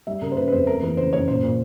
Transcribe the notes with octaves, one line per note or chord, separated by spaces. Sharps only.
G3 E5
C#3 A#4
C5
C#3 B4
B4
F2 C5
A3 A#4
E3 B4
C#3 C5
F#2 C#5
A#2 C5
A#2